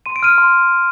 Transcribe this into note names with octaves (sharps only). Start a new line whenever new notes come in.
C6 D#7
D7
F6 D#7
C6